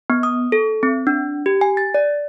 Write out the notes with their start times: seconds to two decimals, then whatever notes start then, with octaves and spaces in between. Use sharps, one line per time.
0.10 B3
0.23 D#6
0.52 A4
0.83 C4
1.07 D4
1.46 G4
1.61 G#5
1.77 A6
1.94 D5